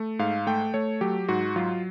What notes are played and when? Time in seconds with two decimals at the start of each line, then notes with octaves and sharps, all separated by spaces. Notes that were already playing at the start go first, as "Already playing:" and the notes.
Already playing: A3
0.19 G#2 F5
0.47 A3 G5
0.74 A3 C#5
1.01 F#3 G4
1.29 G#2 F#4
1.56 F#3 F4